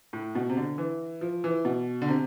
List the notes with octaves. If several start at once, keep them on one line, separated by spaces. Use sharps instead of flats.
A2
B2
C3
D3
E3
F3
E3
B2
D3
C3